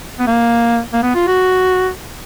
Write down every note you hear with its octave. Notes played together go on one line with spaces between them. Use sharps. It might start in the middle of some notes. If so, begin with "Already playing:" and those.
B3
A#3
A#3
B3
F4
F#4